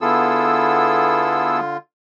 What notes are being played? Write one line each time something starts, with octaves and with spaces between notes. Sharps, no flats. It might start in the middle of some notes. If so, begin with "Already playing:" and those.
D3 B3 E4 F4 G#4 A4 E6